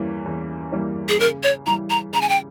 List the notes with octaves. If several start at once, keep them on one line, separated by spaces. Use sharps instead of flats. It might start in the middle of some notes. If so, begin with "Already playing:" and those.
Already playing: E2 E3 G3 A#3 C#4
E2
E3 G3 A#3 C#4
G#4
C#3 A#4
C#5
E3 G3 A#5
A#5
C#3 A#5
G#5
G5